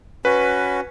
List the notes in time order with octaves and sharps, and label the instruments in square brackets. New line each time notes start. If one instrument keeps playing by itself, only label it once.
[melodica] C#4 F#4 [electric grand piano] B4